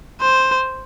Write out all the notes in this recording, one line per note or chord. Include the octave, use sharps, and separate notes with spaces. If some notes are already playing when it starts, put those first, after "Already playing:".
C5